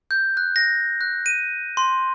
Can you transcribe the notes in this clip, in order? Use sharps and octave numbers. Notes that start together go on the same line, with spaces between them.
G6
F#6
A#6
F#6
D#7
C6